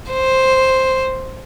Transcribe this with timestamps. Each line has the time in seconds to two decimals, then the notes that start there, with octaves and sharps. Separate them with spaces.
0.11 C5